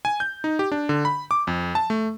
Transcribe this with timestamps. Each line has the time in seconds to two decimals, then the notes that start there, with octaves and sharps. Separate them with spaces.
0.05 G#5
0.20 G6
0.44 D#4
0.59 G4
0.72 D4
0.89 D3
1.05 B5
1.31 D6
1.47 F2
1.75 A5
1.90 A3